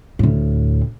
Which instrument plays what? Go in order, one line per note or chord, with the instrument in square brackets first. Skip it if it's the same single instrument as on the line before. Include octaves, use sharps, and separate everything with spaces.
[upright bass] D2 A2